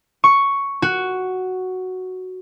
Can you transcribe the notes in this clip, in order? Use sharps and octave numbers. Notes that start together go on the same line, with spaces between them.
C#6
F#4